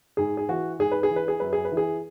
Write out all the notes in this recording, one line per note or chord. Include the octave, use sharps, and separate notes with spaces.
G#2 G#4
G#4
E3 F#4
G#2 G#4
B4
G#4
E3
B4
G#4
F#2 B4
G#4
B4
E3
G#4